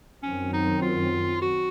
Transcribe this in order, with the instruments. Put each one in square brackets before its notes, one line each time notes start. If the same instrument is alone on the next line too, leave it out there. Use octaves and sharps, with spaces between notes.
[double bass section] F#2 D#3 F#3 C4 [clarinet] C#4
[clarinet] D#4
F4
F#4